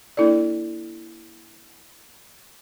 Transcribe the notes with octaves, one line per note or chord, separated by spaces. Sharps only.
A#3 D4 E4 A4 D5